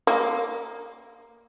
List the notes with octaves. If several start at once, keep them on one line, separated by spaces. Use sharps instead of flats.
A#3